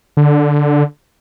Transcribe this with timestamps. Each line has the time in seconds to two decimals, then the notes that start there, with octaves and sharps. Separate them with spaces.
0.17 D3